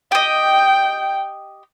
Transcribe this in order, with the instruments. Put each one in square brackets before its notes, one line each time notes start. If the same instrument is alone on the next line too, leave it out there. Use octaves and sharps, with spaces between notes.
[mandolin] G4 D#5 [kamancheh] G5